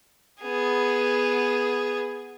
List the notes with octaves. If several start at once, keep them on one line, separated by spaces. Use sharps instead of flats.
B3 G#4